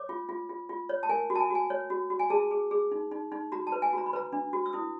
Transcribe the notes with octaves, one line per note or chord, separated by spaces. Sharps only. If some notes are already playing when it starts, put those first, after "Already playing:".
Already playing: C#5 D6
F4
F4
F4
F4
C#5
A5
A#4 G#5
F#4
A5
G#5
F#4 G#5
C#5
F#4
F#4
G#5
G#4 A5
G#4
G#4
D#4
D#4
D#4
F#4 A#5
A5
B4
G#5
F#4 A#5
B5
B4 A#5
D4
F#4
E6
E4 D#6